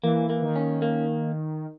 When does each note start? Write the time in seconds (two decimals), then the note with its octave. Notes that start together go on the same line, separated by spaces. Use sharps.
0.03 E3 A#3
0.30 A#3
0.42 D#3
0.56 C#4
0.82 A#3